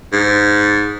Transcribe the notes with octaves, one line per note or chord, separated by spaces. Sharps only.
G#2